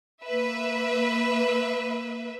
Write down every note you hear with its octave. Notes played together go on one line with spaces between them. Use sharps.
A#3 B4 E5